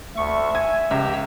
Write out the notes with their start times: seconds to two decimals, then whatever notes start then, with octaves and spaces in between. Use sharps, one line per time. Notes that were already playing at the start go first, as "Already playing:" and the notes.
0.17 D2 E5 C#6
0.55 G#5 G#6
0.91 C#2 G4 A#5 E6